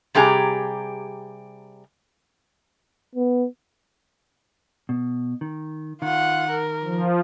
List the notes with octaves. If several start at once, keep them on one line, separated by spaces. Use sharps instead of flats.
C3 G3 G4 G#4 A#5
B3
B2
D#3
D#3 F4 F#5
A#4
F3